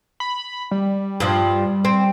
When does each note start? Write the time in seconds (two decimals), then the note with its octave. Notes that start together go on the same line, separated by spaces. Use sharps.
0.20 B5
0.71 G3
1.20 G2 F3
1.85 C4